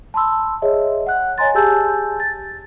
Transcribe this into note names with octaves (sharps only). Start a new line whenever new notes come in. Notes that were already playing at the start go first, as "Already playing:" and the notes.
A5 B5 C6 E6
G#4 C#5 D#5 E5
F#5 F#6
C#5 D#5 G#5 A#5 C6 A6
G4 G#4 G#5 A5 E6 G6
A6